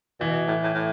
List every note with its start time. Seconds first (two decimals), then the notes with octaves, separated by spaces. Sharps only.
0.20 B2 E3
0.47 A2
0.62 A2
0.74 A2